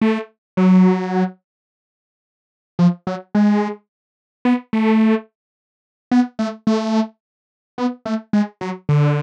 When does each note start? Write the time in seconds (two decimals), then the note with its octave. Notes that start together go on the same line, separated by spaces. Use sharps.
0.01 A3
0.57 F#3
2.79 F3
3.07 F#3
3.35 G#3
4.45 B3
4.73 A3
6.11 B3
6.39 A3
6.67 A3
7.78 B3
8.06 A3
8.33 G#3
8.61 F#3
8.89 D3